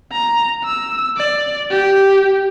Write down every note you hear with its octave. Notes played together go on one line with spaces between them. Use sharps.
A#5
E6
D5
G4